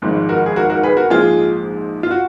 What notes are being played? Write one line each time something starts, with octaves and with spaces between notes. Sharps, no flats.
G#1 G#2 F3 G#3
F#4 A#4
G#4
F#4 A#4
F#4 A#4
G#4 B4
F#4 A#4
A#1 G#2 F3 G#3 F4 G#4
F4
F#4